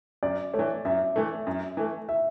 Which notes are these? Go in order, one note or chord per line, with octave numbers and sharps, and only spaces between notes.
F#2 D5
A3 C#5
E3
F#2 E5
E3 A3
F#2
E3 A3
E5